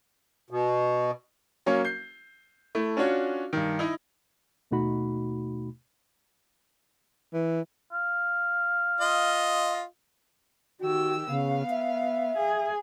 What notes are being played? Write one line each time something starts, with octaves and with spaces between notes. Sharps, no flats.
B2
F#3 A#3 C#4 C#5
G6 C7
A3 E4
C#4 D4 F4 F#4 C#5
G2 D#3
D#4 E4 D#5
D#2 B2 A3 D#4 F#4 B5
E3
F5
F4 D#5
D#3 F#4 G4 E6
C#3 B3 F5
E5
G#4